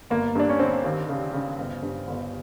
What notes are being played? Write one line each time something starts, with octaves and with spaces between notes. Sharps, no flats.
G1 A#3
G2 D4
C#4
D3 C4
D#2
C#3
C#3
G1
G2
G1